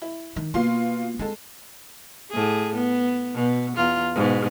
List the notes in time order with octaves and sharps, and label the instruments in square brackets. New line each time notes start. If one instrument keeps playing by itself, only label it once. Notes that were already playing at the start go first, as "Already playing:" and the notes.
[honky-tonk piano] E4
[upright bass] D#3
[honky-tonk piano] B2 F4 C6 [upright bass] A#3
[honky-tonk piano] G#3 A4 [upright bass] C4 E4
[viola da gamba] A2 G#4
B3
B2
E2 F4
G#2 B2